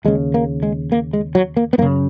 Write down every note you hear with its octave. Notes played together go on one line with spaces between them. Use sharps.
D#2 C#3 G#3
A#3
G#3
A#3
G#3
F#3
A#3
B3
F#2 C#3 A#3